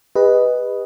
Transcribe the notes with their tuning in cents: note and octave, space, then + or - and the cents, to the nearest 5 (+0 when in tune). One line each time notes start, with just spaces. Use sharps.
G4 +45 B4 +0 D#5 +0